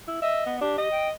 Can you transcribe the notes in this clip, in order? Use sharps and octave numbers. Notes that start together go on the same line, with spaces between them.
E4
D#5 E5
B3
D4 G4
D#5
G5